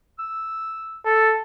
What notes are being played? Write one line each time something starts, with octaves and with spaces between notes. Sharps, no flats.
E6
A4